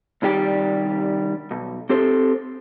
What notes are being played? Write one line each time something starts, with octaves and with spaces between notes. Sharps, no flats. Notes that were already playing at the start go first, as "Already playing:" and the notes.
C2 D#3 G3 G4 D5
B1
C4 G4 A4 C5